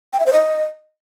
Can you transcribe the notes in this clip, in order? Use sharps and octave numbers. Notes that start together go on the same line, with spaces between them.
G5
E5
C5
D#5